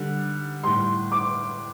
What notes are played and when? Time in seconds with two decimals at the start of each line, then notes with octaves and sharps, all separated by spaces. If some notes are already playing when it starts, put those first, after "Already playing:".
Already playing: D3 G3
0.63 A2 G3 C6
1.12 D6